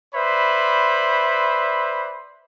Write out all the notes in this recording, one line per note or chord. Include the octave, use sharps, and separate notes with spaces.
B4 C5 D5 E5 B5